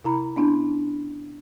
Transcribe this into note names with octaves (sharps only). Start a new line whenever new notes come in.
C3 E4 A#5 B5
B3 C#4 D4 E4